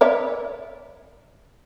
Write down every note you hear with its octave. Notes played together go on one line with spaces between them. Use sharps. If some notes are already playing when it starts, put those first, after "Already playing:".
C#5 D5 E5